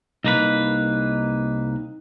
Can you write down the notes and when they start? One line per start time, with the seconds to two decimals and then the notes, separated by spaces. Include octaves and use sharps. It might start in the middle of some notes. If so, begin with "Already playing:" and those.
0.25 C2 A#3 D#4 B4